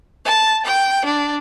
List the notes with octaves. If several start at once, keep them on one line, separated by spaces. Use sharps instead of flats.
A5
G5
D4